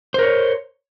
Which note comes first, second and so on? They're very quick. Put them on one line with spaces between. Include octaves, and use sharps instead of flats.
C5 A#4 C#5